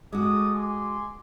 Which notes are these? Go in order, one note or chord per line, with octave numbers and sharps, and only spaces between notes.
G#3 F#4 A4 D6 D#6
G#5 C6 D6